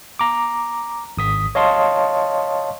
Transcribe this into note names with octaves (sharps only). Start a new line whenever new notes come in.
A#5 D6
G#1 D#6 B6
C#5 D#5 F5 A5 C6 C#6